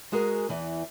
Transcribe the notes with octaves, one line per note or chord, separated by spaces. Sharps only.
G#3 F#4 G#4 A#4
E2 E3